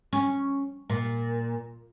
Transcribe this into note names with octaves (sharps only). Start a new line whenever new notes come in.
C#4
A#2